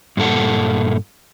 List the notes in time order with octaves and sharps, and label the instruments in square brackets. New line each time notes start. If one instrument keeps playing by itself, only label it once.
[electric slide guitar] G2 A#2 A4 F#5